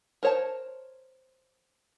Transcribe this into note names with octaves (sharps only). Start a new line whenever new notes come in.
A#4 C5 C#5 G5 A5